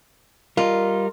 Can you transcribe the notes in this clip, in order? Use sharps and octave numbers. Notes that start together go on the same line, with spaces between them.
G3 F4 A#4 D#5